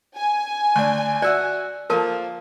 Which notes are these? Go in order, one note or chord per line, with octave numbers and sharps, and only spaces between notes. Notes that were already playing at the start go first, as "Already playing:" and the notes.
G#5
D2 D4
F#4 D5 E5 F#5
F3 A#3 A4 A#4 A5